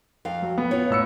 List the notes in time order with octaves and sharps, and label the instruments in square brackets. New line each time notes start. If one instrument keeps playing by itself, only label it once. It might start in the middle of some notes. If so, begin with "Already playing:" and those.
[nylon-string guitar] F2 F5
[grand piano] F#3
B3
[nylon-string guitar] F4 C#5
[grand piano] A2 E6 C#7